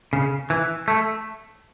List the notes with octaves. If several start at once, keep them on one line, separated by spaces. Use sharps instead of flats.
C#3
E3
A3